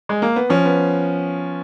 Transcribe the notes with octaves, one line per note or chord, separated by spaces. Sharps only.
G#3
A#3
B3
F3 C#4
B3